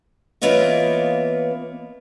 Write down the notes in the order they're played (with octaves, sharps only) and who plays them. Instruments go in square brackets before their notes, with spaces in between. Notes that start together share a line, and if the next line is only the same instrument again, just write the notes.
[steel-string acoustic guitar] E3 A#3 B3 F4 C#5 D#5